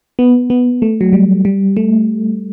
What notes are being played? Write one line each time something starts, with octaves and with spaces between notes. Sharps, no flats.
B3
B3
A3
F#3
G3
G3
A3